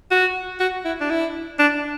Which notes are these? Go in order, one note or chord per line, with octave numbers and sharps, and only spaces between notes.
F#4
F#4
E4
D4
E4
D4